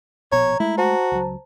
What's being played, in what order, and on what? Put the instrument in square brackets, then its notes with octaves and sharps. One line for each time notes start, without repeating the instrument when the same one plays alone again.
[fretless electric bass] A#1 B2 [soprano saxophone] C#5 [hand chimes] A#5
[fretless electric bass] G#3 A3 [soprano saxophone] E4
[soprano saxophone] F#4 [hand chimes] C5 A5 A#5
[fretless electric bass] C#2 F#3